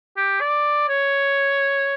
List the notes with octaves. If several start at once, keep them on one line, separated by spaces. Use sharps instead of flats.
G4
D5
C#5